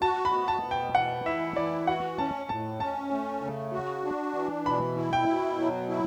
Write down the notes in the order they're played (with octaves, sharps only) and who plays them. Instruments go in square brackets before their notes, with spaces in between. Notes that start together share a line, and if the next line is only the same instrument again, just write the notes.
[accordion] F#4 [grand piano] A5
[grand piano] B5
[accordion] B3
[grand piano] A5
[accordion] B2
[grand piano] G5
[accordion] E3 [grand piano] F#5
[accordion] E4 [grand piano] E5
[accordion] E3 [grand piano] D5
[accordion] F#4 [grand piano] F#5
[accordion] C#4 [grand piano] A5
[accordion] A2 [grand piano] A5
[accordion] C#4 [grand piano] A5
[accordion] A3
C#3
F#4
D4
E3
[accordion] B2 [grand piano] B5
[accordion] E4
[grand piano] G5
[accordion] B2
F#3
E4